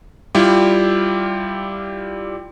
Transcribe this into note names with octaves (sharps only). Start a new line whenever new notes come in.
G3 E4 F4 G4